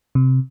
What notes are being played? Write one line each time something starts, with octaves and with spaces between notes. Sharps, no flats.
C3